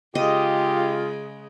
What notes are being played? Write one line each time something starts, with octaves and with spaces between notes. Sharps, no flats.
C#3 G#3 F4 G4 D#5